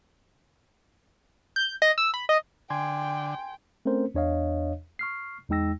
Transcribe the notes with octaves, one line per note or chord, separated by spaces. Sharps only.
G6
D#5
E6
B5
D#5
D3 G5 G#5 C6 G#6
A3 C4 C#4 A#4 C5
E2 D4 C#5 D#5 F5
C#6 F6 C7
E2 G#3 D#4 G5 E6 A#6